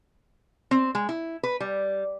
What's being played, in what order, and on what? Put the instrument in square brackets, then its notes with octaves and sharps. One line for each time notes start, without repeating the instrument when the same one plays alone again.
[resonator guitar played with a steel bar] C4
G#3
E4
B4
G3